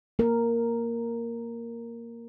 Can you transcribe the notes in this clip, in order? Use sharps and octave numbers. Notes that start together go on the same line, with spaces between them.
A#3 A#4